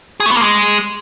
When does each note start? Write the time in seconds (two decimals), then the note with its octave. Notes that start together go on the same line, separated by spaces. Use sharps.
0.20 G#4
0.26 A3
0.31 B3
0.37 A#3
0.42 G#3